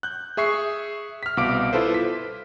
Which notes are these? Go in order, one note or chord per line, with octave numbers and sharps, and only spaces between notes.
F#6 G6
G#4 E5 C#6 C7 C#7
F6 B6
C2 B2 F5 D6 D7
E4 F4 A4 B4 C5
B6